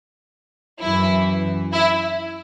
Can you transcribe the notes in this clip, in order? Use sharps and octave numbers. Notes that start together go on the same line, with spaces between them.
F#2 E3 E4
E4